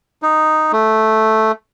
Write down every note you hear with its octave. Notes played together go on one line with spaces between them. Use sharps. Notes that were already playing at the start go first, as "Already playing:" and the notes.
D#4
A3